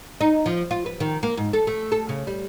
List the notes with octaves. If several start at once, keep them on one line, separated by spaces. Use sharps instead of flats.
D#4
F3
F4
B4
D#3
A#3
G#2
A4
A3
A4
C#3
G3